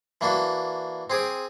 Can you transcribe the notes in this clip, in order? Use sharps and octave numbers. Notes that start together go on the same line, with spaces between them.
E3 A#3 D4 F#4
C4 G#4 D6 D#6